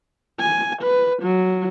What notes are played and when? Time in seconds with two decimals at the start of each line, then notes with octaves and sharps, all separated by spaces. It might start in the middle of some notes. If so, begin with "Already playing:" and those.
0.40 G#5
0.82 B4
1.23 F#3